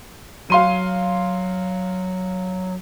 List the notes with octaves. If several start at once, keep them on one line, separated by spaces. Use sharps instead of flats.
F#3 F5 C6 D#7